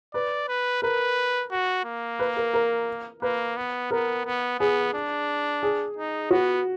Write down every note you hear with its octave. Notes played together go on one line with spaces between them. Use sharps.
B4 D5
B4
A#4 B4
F#4
A#3
B4
A#4
A#4
A#3 B4
B3
B3 A#4
B3
B3 G#4
D4
G#4
D#4
B3 F#4